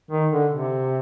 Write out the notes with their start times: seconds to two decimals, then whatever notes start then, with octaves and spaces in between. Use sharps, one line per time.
0.11 D#3
0.32 D3
0.53 C3